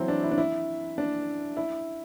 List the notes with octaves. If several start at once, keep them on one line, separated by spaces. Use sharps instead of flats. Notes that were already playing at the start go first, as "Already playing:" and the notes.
Already playing: E3 F#3 C4 E4
D4
E4
D4
E4
D4
E4